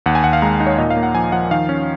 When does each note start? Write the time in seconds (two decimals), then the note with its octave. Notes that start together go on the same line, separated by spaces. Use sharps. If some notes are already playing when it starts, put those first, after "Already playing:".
0.06 D#2 F#5
0.15 G#5
0.24 D#2 F#5
0.33 F5
0.42 G#3 A#5
0.60 D#4
0.66 C#5
0.78 A#2 D#5
0.90 F5
0.97 A#3
1.03 F#5
1.14 F3 G#5
1.32 F3 F#5
1.51 D#3 F5
1.69 C#4